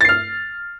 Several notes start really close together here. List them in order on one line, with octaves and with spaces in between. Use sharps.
A6 C7 F6